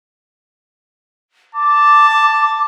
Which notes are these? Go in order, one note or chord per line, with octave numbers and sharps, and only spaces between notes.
A5 D6